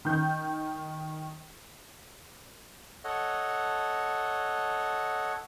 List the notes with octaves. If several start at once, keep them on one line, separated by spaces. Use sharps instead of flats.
D#3 G6
A4 C#5 D#5 F#5